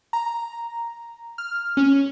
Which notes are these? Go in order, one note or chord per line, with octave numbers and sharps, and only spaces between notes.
A#5
F6
C#4